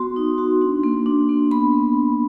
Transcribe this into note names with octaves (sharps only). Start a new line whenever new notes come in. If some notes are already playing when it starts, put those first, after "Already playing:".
Already playing: B3 F#4 C6
D#4
F#4
D4
A#3
D4
A#3
B3 B5
B3
B3